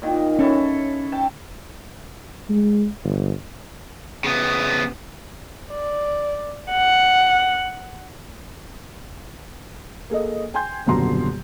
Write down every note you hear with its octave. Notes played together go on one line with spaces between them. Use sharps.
A#2 D#3
C#4 E4 A4 C#6
G5 A5
G#3
G1
C#3 B3
D5
F#5
A#3 G#4 A4 D#5
G5 G#5 C6 G6
D#1 F#2 B2 D3 A#5 C6